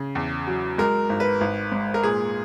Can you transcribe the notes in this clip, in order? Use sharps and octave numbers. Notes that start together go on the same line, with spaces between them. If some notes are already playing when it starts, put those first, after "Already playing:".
Already playing: C#3
E2
F#3
G#3 A#4
G#1
B4
G#1
G#2
A#4
A#2 G#4